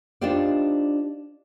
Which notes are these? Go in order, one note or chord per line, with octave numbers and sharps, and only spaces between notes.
D4 D#4 F4 G4 C5 D5